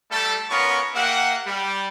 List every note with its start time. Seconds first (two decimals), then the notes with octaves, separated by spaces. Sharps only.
0.10 G3 A3 A4
0.50 B3 C#4 F4 A#4 C#6
0.95 A#3 G4 E5 F#5
1.46 G3